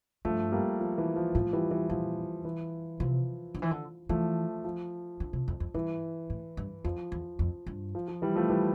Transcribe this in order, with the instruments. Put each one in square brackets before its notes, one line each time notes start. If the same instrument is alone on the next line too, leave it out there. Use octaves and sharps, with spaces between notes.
[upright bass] G2 [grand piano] F3 A3
[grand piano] G3 A#3
F3
E3
F3
[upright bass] A2 [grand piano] F3
[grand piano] E3 G3
E3 G3
[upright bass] A#2 [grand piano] F3
[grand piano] E3
[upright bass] C3 [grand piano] F3
[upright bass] D3
E3
D3
[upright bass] E3 [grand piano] F3 A3
[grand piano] F3
[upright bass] D3
C3
F2
F2
[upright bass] G2 [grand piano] E3
[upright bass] A2
G2
[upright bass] F2 [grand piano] F3
[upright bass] E2
F2
G2
[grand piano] F3
F3
E3 G3
F3 A3
E3 G3